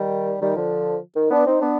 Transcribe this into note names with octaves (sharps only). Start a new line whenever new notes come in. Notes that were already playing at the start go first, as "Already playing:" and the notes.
Already playing: D#3 G3
D#3 G3
D3 F3
D#3
B3 D4
C4 D#4
B3 D4